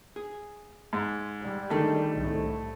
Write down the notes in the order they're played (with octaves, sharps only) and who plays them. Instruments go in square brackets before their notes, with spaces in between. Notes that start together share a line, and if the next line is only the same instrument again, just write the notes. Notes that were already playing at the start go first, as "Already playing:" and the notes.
[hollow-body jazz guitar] G#4
[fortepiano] G#2
[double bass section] G3
[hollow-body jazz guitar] D3 D#3 G#3 [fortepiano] A3
[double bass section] C2 A2